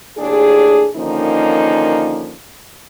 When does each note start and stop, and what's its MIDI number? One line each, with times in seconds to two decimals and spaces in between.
0.18 0.86 39
0.18 0.86 45
0.18 0.86 62
0.18 0.86 68
0.95 2.34 50
0.95 2.34 51
0.95 2.34 53
0.95 2.34 58
0.95 2.34 61
0.95 2.34 63